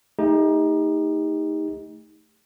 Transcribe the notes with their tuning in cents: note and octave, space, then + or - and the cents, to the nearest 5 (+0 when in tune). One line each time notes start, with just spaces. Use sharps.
A3 +0 D#4 +15 G4 +40